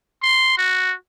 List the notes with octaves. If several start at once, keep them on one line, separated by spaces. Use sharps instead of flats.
C6
F#4